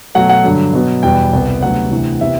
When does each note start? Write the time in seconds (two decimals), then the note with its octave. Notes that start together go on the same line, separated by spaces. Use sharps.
0.15 B2 F#3 A3 F#5
0.29 F#5
0.44 G2 D3 F#3
0.73 B2 F#3 B3
1.03 E2 B2 G3 B3 G5
1.33 C2 C3 G3 B3
1.62 D2 C3 F#3 B3 F#5
1.91 D2 C3 E3
2.21 C3 E3 B3 E5